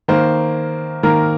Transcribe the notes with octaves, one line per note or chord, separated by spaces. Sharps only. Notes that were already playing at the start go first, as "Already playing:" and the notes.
D#3 A#3 C5
D#3 A#3 A#4